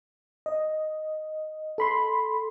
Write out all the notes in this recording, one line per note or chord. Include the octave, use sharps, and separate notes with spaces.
D#5
A4 B5 C6